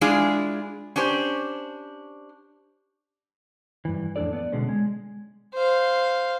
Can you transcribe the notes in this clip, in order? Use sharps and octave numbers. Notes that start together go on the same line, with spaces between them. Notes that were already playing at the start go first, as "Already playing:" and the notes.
G#3 D4 E4 F4 G#4
C#4 D4 G4 C5
G2 E3
F2 A2 D4 A4 D5
B3 D5
B2 D3 G#3 C#4
G#3
C5 F5